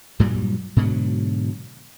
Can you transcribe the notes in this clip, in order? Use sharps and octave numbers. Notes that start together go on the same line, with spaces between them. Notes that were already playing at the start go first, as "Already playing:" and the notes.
G2 A#2 F#3 G3
G#2 B2 D3 F#3